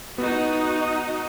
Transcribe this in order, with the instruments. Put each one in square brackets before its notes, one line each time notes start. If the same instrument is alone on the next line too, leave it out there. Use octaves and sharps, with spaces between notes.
[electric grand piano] B3 [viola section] D#4 F#4